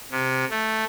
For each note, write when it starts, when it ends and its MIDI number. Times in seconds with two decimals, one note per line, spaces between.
0.11 0.45 48
0.50 0.84 57